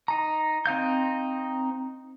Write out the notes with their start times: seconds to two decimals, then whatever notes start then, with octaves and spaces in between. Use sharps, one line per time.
0.08 D#4 A#5
0.66 C4 D#4 F5 G6